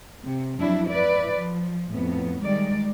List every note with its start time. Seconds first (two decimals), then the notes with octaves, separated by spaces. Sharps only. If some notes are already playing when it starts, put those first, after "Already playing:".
0.24 C3
0.58 F2 F#3 D4 E4
0.88 E4 B4 D5
1.34 F3
1.92 F2 A2 B3
2.44 D#3 G3 G#3 D5